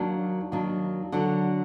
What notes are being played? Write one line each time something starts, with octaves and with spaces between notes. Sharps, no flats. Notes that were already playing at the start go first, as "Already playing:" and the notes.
Already playing: D#2 D#3 F#3 A#3 D4
D#2 D#3 F#3 A#3 D4
D3 F#3 D4